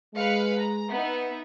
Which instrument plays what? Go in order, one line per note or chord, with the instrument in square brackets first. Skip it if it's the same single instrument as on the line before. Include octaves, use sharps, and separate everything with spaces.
[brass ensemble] G#3 [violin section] B4 F5 C#7
[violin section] A#5
B3 D#4 E5